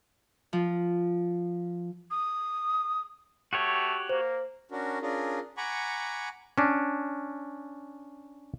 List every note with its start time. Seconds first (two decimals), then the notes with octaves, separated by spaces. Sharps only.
0.53 F3
2.11 D#6
3.53 A3 F#4 G4 C#5
4.09 A#3 C5
4.71 C#4 D4 F#4 A#4
5.02 C#4 D4 F4 G#4 A#4
5.57 F#5 G#5 A#5 B5 C#6 D6
6.58 C#4 D4